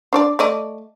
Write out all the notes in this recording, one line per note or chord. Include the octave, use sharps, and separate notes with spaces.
D4 C#5 D5
A3 D5 D#5